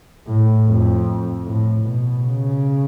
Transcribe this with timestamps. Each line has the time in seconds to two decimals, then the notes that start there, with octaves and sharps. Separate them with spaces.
0.27 A2
0.67 F2
1.45 A2
1.83 B2
2.23 C#3